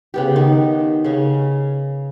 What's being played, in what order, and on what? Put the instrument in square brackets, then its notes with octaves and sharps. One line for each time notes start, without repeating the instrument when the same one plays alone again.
[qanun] C#3 B3 G4
D#3
C#3 C#4